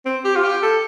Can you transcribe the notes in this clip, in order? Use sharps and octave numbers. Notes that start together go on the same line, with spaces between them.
C4
G4
F4
G4
A4